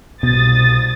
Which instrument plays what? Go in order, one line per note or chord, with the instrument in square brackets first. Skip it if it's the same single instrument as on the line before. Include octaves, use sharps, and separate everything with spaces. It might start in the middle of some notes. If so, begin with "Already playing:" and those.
[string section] C2 D#6 A6 [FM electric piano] B2